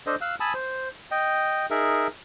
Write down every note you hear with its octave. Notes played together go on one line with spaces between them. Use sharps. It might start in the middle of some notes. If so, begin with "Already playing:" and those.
D4 A4 C5 D#5
F5 E6 F#6
G#5 A5 B5 D#6 E6
C5
D#5 G5
D#4 G#4 A#4 E5